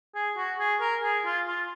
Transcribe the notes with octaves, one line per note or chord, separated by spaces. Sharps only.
G#4
F#4
G#4
A#4
G#4
F4
F4